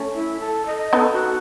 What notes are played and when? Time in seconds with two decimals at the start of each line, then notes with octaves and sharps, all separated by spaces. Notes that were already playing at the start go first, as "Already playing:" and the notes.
Already playing: A3 C#4
0.14 E4
0.40 A4
0.66 D#5
0.93 B3 D#4 A4
1.13 F#4